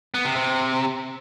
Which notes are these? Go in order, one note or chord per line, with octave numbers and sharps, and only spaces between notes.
B3
C3
C3